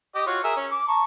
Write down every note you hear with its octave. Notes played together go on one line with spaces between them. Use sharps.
G4 D#5 D6
F4 F#4 C#5
G#4 A#4 E5
C#4
D6
A5 A#5 C#6